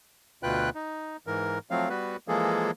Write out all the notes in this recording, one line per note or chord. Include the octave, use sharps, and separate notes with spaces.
D2 B2 F4 B4 G5 F#6
D#4
G#2 E3 A#4
F3 F#3 A3 C4 F5
G3 B3 F#4 B4
E3 F3 G#3 A#3 G#4 A4